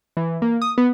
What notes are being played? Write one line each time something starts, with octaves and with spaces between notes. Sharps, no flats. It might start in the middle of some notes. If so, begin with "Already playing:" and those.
E3
A#3
D#6
B3